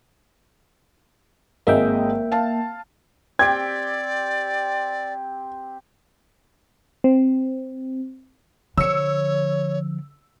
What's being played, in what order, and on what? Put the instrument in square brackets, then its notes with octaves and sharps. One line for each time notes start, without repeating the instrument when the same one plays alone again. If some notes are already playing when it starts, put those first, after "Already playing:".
[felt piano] G#1 G#3 D#5 [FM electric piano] A#3 E5 G5
[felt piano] F5 A5
[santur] C4 G4 G5 [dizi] D5 [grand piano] G#6
[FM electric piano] C4
[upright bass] D3 F3 [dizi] C#5 [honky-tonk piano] E6 C#7